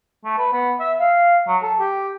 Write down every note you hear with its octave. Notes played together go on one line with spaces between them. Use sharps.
A3
B4
B3
E5
F5
F#3
A4
G4